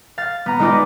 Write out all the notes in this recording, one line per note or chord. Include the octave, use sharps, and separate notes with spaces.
F5 A6
B3 A#5
G#3 B3 D#4 F4 D5 D#5